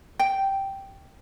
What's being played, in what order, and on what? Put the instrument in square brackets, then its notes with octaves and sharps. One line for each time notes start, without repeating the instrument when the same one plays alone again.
[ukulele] G5